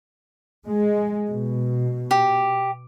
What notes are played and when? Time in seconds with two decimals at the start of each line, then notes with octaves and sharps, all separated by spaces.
0.69 G#3
1.29 B2
2.11 G4